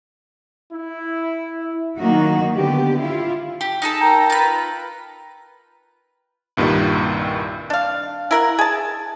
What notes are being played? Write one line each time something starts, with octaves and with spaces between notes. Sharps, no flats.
E4
D#3 F#3 A#3 D#4 F#4
D3 B3 G4
E4 F4
G4
D#4 G#4 A4
A#4 G5 A#5
F4 B4
C2 G2 A#2 D#3 G3
D4 F5
E4 A#4 F#5
G#4 A5